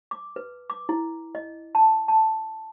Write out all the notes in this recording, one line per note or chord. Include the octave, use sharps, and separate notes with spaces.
D6
B4
D6
E4
D#5
A5
A5